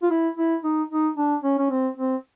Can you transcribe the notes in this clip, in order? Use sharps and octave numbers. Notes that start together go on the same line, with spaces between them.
F4
E4
E4
D#4
D#4
D4
C#4
C#4
C4
C4